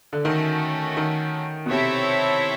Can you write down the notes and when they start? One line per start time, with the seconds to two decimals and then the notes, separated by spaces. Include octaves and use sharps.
0.13 D3
0.24 D#3 A3 C#4 F#4
0.97 D#3
1.66 B2
1.70 C3 C4 E4 A4 C#5 E5